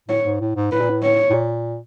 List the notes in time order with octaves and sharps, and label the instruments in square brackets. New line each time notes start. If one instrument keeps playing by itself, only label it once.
[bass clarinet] A2 [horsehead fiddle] C#5
[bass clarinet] G#2
A2
G#2
[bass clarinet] A2 [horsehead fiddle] B4
[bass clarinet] A#2
A2
[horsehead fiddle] C#5
[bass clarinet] A2
A#2